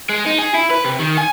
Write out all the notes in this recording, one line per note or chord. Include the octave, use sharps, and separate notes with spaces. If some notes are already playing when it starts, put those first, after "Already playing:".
G#3
D#4
G#4
E4
B4
C3
D#3
G#5